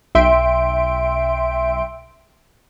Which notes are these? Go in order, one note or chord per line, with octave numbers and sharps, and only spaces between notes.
B1 E5 G5 C6 D7